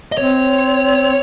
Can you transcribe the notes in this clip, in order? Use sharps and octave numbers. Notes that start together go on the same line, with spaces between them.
D#5
C4 C#5